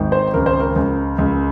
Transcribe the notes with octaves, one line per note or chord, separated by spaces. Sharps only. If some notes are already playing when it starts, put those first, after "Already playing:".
Already playing: G#1 D#3
C5
C#2 A#4
C5
A#4
C#2
C#2